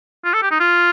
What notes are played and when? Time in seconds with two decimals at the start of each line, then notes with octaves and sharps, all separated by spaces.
0.25 F4
0.34 A4
0.43 G4
0.51 D#4
0.60 F4